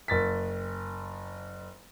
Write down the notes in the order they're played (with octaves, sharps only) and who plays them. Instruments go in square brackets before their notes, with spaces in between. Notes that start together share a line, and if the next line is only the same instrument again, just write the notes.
[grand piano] F#1 A6 B6